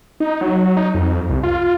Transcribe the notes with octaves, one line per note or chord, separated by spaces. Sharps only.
D#4
F#3
D#4
F2
C2
F4